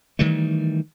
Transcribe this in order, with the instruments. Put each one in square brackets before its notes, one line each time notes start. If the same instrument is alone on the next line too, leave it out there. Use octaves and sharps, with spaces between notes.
[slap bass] D#3 E3 G3 A3